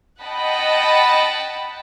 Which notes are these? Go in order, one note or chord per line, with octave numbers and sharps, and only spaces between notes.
D#5 F#5 G5 A5 B5